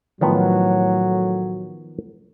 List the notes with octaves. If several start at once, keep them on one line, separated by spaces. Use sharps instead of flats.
A2 D#3 F3 F#3 B3